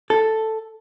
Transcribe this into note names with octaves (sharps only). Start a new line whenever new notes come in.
A4